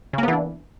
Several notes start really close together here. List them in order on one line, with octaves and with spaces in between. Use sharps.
C#3 A#3 B3 E3 D4